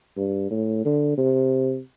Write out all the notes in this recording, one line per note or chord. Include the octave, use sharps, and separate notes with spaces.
G2
A2
D3
C3